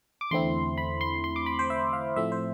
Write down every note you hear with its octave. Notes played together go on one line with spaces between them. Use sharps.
D6
E2 D3 A3 C4 E4 C6
B5
C6
C6
D6
B5
C5
E5
F5
A2 F3 A3 C4 E4 E5
C5